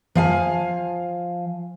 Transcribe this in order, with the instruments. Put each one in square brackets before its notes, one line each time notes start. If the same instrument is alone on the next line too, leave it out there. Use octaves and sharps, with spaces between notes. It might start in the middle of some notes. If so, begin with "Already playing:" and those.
[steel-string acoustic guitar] F3 F5 G#5